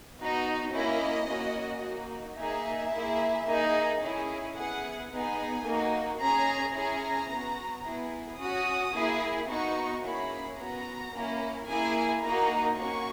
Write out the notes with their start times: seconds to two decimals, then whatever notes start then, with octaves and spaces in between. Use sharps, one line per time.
0.18 B3 D#4 F#4
0.72 A#3 C#4 E4 D#5
1.27 A#3 C#4 F#4
1.82 A#3 D#4 F#4
2.37 A#3 D#4 G#4 E5
2.92 A#3 E4 G#4
3.46 A#3 D#4 G#4
4.01 C#4 E4 G#4
4.55 B3 E4 G#4 F#5
5.10 B3 D#4 G#4 G#5
5.65 A#3 D#4 F#4
6.20 C#4 G#4 A#5
6.74 C#4 E4 G#4 A#5
7.30 B3 F#4
7.84 B3 E4 G#4
8.39 C#4 F#4 D#6
8.94 A#3 E4 G#4
9.48 B3 D#4 F#4 C#6
10.03 A#3 C#4 E4 G#4 B5
10.58 B3 F#4 A#5
11.13 A#3 C#4 E4
11.68 A#3 E4 G#4 G#5
12.22 A#3 D#4 F#4 A#5
12.77 A#3 C#4 F#4 C#6